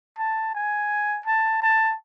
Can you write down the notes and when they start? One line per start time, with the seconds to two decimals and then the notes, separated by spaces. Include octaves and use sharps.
0.18 A5
0.55 G#5
1.26 A5
1.62 A5